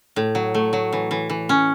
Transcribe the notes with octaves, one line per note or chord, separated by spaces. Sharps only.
A2
F#3
A3
F#3
E3
E3
E3
C#4